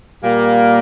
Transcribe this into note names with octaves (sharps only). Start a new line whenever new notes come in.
A#2 G3 A#3